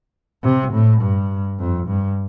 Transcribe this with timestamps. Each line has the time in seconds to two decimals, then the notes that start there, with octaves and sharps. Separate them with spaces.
0.43 C3
0.72 A2
1.01 G2
1.59 F2
1.87 G2